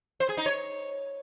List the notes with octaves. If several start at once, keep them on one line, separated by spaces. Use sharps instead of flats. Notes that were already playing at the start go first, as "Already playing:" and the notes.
C5
G#4
D#4
C#5